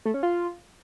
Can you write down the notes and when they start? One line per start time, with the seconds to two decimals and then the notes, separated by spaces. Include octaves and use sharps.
0.05 A3
0.14 C#4
0.23 F4